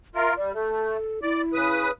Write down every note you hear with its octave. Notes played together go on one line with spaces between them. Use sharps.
F4 A#4 E5
G3 D5
A3 A4
E4 D5
C#3 B4 D#6